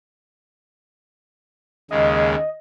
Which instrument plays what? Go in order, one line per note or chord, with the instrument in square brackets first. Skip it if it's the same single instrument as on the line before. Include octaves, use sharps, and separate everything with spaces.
[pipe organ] D#2 C#3 G#3 [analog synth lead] D#5